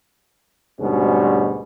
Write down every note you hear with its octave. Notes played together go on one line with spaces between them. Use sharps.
D2 G#2 B2 G3 G#3 C#4